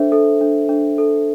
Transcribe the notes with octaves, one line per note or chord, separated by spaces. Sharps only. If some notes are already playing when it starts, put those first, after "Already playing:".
Already playing: D4 A4 C5 E5
A4
D4
D4
A4